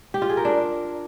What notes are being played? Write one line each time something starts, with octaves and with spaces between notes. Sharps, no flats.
G4
F4
G#4
A#4
D4